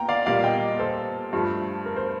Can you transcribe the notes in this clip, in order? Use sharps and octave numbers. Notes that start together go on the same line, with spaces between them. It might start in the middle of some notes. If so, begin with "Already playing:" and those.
Already playing: A#2 G5 A#5
D5 F5
A#2 G3 A#3 D5 F5
D#5 G5
A4 C5
G2 F3 A3
A#4
C5